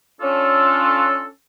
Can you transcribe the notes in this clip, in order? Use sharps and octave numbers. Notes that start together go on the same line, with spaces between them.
C#4 D4 F4 A4